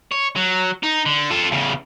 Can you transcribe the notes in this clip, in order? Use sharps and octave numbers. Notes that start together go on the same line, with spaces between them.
C#5
F#3
D#4
D3
F4 A4
E2 C#3